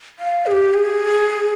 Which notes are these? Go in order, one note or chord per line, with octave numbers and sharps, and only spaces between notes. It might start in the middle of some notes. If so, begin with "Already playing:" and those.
F5
G#4
G4
G#4